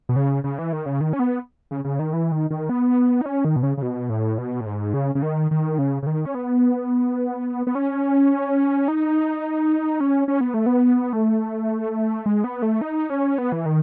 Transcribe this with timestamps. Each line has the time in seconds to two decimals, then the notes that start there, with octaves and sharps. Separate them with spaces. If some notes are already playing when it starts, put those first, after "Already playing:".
0.09 B2
0.16 C#3
0.44 C#3
0.59 E3
0.73 D#3
0.86 C#3
1.01 D#3
1.13 C#4
1.19 B3
1.71 C#3
1.84 C#3
1.99 D#3
2.13 E3
2.32 D#3
2.50 D#3
2.69 B3
3.21 D#4
3.26 C#4
3.45 D#3
3.56 B2
3.63 C#3
3.78 C#3
3.82 B2
4.10 A2
4.38 B2
4.61 A2
4.66 G#2
4.94 C#3
5.15 C#3
5.23 D#3
5.51 D#3
5.78 C#3
6.03 C#3
6.07 D#3
6.25 C#4
6.35 B3
7.67 B3
7.75 C#4
8.88 D#4
10.00 C#4
10.28 C#4
10.41 B3
10.54 A3
10.66 B3
11.13 A3
12.26 G#3
12.44 B3
12.62 A3
12.81 D#4
13.10 C#4
13.38 B3
13.52 E3
13.66 D#3